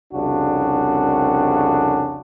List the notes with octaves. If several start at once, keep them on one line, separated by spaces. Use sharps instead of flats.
C2 F2 C#3 D4 F#4